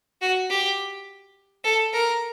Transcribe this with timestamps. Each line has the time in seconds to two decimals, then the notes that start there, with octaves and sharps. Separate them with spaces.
0.22 F#4
0.50 G4
1.64 A4
1.93 A#4